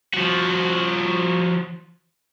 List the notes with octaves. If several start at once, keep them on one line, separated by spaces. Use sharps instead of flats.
F3 F#4